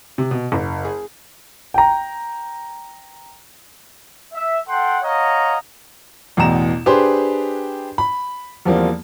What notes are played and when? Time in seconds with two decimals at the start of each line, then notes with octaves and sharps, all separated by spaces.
0.18 C3
0.31 B2
0.52 F#1
0.84 G#4
1.74 G5 A#5
4.33 E5
4.68 A4 F#5 G5 C6
5.03 C#5 D#5 F5 F#5 A#5
6.37 A1 E2 B2 A#5 E7
6.86 D4 G4 G#4 B4 C5 C6
7.98 B5
8.65 E2 F3 G3 A#3 C4